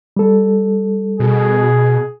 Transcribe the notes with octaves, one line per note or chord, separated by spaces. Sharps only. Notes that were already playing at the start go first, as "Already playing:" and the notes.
G3 A4
B2 G#4